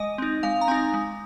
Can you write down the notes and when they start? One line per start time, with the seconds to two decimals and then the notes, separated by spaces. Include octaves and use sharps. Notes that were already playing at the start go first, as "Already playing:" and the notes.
Already playing: G#3 D#5
0.18 C4 D#4
0.43 G#3 F5
0.61 A#5
0.68 C4 D#4 G#5
0.94 G#3